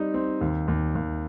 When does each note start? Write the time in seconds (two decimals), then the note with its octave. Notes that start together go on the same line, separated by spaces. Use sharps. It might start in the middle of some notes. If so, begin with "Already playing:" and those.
Already playing: G3 C4 D#4
0.14 C4
0.41 D#2
0.68 D#2
0.95 D#2